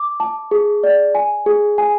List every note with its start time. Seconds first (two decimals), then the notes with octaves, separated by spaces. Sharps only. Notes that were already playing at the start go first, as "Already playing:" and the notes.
Already playing: D6
0.20 A5
0.51 G#4
0.83 D5
1.15 G#5
1.46 G#4
1.78 G#5